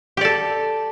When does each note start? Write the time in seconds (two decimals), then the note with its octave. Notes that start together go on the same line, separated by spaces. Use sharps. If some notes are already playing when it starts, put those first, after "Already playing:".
0.17 G4
0.21 D5
0.25 A4